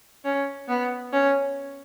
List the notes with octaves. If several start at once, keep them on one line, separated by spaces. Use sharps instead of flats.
C#4
B3
C#4